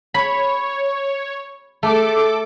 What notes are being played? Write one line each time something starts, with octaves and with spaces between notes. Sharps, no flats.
C#5 B5
A3 A4 D6